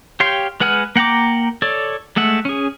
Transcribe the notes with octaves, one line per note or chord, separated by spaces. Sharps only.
G4 C#5 F5 G5 C6
G#3 B4 F#5 G#5 F6
A#3 F#5 G5 A#5 D6
A4 C#5 D5
G#3 A3 E5 F#5
C#4 G#4